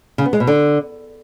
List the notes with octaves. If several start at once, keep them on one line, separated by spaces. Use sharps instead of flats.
C#3
B3
G#3
B2
D3